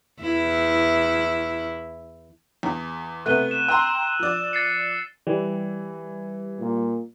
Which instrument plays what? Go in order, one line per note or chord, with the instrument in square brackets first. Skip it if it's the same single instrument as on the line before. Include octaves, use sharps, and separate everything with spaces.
[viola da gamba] E2 E4
[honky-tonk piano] E2
[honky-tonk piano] C3 A3 B3 [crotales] F#6 D#7 G7
[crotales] E7
[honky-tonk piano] G5 A#5 C6 [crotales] E6
[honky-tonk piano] F3 D5
[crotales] A6 C7 C#7
[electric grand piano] E3 [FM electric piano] G3
[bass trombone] A#2